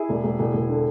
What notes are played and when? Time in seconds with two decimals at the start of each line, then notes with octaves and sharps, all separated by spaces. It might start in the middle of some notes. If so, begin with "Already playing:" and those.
Already playing: E4 G#4
0.09 E1
0.24 E1
0.39 E1
0.54 E1
0.69 D3